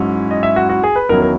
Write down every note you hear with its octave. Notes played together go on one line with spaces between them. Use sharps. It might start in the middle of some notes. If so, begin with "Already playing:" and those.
Already playing: G#2 F#3 C#4 E4
D#5
E5
F#4
F#4
G#4
B4
E2 D#3 F#3 C#4 E4 A#4
A#4